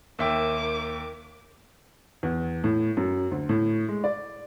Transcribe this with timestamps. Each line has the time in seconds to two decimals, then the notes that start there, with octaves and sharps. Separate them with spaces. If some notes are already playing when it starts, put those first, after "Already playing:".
0.19 D#2 D#3 E5 G5 D6
2.23 E2
2.64 A2
2.97 F#2
3.31 D2
3.49 A2
3.89 G#3
4.04 D5